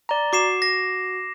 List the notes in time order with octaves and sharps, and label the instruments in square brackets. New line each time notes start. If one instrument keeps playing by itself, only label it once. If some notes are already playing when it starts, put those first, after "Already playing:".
[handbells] D5 A#5
[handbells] F#4 [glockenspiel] D6 C7 E7
[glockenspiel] A#6